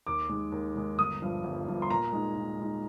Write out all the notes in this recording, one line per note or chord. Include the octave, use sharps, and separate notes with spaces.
D#2 D6
D#3 G#3
D#2
D#3 G#3
G1 D#6
G2 F3
G1
G2 F3
C6
A#2 A#5
G#3 D#4
A#2
G#3 D#4